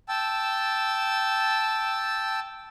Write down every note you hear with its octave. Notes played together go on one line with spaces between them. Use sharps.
G5 A5 E6